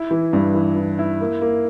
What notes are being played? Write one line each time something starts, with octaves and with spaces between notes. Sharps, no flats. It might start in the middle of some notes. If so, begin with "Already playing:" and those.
Already playing: E4
E3
G2
E3
E3
E4
A#3
A#3